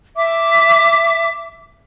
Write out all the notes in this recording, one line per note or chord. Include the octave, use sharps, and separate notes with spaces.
E5 D6